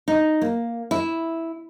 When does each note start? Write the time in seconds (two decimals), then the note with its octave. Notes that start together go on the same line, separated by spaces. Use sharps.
0.08 D#4
0.41 A#3
0.91 E4